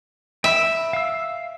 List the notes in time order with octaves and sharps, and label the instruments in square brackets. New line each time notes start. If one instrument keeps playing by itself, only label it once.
[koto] E5 [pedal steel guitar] G5 B5 E6
[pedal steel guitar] F5 E6